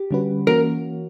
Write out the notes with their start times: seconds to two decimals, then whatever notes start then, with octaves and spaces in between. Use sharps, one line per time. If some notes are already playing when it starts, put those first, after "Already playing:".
Already playing: G4
0.11 D3 G3 C#4 F#4 B4
0.47 E3 A#3 C#4 F#4 A#4